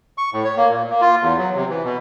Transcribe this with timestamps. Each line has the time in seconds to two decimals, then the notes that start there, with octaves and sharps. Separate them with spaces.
0.18 C#6
0.33 A2
0.44 C#5
0.57 A#3
0.69 A#2
0.90 A#3
1.01 F4
1.22 E2
1.38 F#3
1.55 C3
1.69 E3
1.84 B2